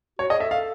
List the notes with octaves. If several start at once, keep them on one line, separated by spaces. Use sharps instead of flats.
F#4 C#5
G#4 D#5
A4 E5
A4 F5